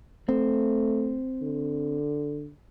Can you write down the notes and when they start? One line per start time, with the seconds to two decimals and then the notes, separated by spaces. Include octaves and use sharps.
0.29 A3 C4
1.42 D3